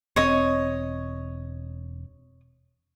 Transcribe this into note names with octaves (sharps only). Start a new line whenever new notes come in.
E1 C4 C#5 D#5